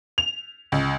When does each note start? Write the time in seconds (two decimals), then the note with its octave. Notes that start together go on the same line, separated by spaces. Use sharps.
0.18 F7
0.72 C#2